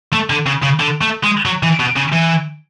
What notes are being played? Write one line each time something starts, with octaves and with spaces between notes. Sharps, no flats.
A3
D3
C#3
C#3
D3
A3
G#3
F#3
E3
B2
C#3
E3